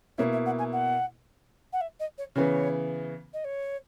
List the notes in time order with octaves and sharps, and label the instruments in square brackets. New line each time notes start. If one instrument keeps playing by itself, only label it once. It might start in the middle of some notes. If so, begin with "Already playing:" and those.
[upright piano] B2 A#3 E4 [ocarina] C#5
[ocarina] E5
F#5
G#5
F#5
F#5
E5
D#5
C#5
[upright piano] C#3 E3 B3 [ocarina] C#5
[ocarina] D#5
C#5